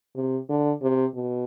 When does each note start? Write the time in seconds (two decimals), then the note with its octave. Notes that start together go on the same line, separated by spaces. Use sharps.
0.15 C3
0.49 D3
0.82 C3
1.14 B2